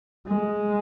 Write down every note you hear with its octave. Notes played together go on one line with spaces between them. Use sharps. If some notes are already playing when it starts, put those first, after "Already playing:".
G#3